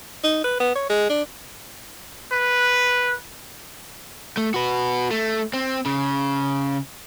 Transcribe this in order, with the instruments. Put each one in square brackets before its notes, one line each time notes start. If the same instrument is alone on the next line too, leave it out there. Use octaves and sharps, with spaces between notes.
[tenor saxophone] D#4
B4
B3
C#5
G#3
D4
[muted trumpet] B4
[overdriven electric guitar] A3
F#4 B4
A3
C4
C#3